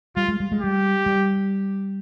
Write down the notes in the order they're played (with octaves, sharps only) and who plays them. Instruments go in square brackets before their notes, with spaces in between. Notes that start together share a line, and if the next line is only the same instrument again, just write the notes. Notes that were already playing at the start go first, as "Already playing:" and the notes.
[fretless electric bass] G3 [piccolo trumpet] F4
[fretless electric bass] G#3
G3
G#3
[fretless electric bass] G3 [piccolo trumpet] G4
[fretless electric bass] G3